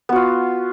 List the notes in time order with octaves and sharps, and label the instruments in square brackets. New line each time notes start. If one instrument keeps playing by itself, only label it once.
[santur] B3
F#4
F4